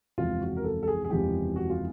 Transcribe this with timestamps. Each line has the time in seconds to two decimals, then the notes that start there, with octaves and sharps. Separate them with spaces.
0.18 F#1 E2 C3 F3 G#3 F4
0.41 F#4
0.56 A#4
0.64 A4
0.83 A4
0.88 G#4
1.04 G#4
1.10 F#1 E2 C3 F3 G#3 G4
1.56 F#4
1.70 F4